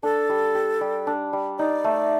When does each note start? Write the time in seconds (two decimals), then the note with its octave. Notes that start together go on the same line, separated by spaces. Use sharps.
0.03 D4 A4
0.29 G3
0.55 G4
0.81 G3
1.07 D4
1.33 G3
1.58 D#4 D5
1.84 A3